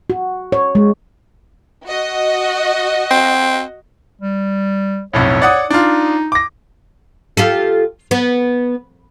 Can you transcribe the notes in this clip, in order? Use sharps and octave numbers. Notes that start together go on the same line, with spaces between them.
F#4
C#5
G#3
F#4 D#5
C4
G3
B1 F2 A2 C#5
D5 F#5 D#6
D4 D#4 F4
D6 A#6
F4 G4 A4
B3